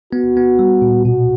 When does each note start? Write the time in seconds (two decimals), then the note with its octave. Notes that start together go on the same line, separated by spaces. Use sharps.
0.13 B3 F#4
0.37 B3
0.59 G3
0.82 A#2
1.05 B2 F#4